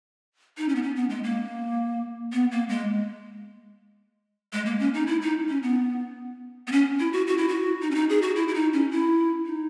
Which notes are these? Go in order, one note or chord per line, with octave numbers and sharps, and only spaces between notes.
D#4
C#4
B3
C#4
B3
G#3
A#3
B3
A#3
G#3
G#3
A#3
C#4
D#4
E4
D#4
C#4
B3
B3
C#4
E4
F#4
F#4
E4
F#4
D#4
C#4
D#4
G#4
F#4
E4
E4
D#4
C#4
E4
D#4